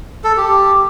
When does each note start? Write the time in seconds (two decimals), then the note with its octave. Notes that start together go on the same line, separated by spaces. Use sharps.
0.24 A4
0.37 G4